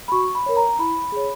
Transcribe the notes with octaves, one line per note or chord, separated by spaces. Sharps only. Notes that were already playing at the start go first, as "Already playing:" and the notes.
B5
F#4 C#6
B5
A#4 C#5
A#5
E4 B5
G#4 C#5